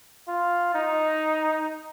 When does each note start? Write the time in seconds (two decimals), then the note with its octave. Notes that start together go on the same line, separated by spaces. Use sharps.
0.28 F4
0.75 D#4